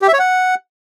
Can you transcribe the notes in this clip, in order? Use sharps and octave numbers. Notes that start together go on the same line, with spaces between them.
G4
E5
C#5
F#5